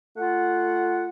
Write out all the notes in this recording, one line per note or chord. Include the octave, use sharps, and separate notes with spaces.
A3 F4 F#5